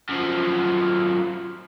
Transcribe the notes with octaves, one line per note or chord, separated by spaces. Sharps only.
F#2 F3